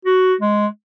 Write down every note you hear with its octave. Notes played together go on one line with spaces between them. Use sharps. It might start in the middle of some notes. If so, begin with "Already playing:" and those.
F#4
G#3